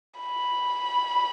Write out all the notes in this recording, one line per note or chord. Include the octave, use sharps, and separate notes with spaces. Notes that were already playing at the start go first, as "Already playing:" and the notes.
B5